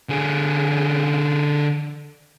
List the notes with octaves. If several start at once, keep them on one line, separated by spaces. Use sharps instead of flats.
D3 G#4